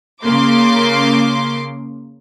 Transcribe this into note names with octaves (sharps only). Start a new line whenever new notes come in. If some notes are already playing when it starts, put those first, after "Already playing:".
C#3 A#3 C6 D6